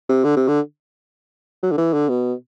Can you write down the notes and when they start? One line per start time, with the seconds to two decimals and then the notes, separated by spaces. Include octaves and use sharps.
0.09 C3
0.24 D3
0.36 C3
0.48 D3
1.63 F#3
1.72 D3
1.78 E3
1.93 D3
2.09 B2